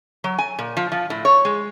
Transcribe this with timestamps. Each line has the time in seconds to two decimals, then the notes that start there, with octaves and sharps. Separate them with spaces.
0.24 F#3
0.39 G#5
0.59 A#2
0.77 F3
0.92 F3
1.10 A2
1.25 C#5
1.45 G#3